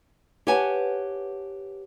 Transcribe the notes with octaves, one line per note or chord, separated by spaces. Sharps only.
G4 B4 C#5 F#5 G#5 A5